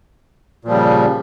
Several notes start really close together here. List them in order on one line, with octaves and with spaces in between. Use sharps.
A#2 F3 G3 C#3